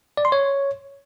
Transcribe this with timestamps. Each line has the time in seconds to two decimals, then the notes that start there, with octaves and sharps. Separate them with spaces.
0.17 D5
0.25 C6
0.32 C#5